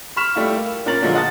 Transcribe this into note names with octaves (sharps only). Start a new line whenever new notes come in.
B5 C#6 F6 B6 E7
G3 A3 E4 F4
A#3
A#2 C#4 A#4 A6 F#7
A#2 D3 F3 F#3 G#3 A#3
D#5 F#5 A5 D#6 A6